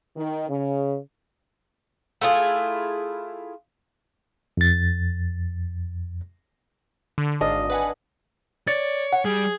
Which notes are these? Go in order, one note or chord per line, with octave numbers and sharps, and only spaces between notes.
D#3
C#3
A3 E4 F4 G#4
F2 A6
D3
G#1 D4 D#5 F5
B4 F#5 G#5
C#5 D5 A6
F#5
G3 G#4